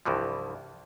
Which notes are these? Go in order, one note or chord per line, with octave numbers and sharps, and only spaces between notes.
C2 G2 E3 F3